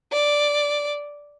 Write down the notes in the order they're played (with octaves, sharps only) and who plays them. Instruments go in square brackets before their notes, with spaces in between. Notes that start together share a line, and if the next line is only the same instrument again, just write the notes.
[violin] D5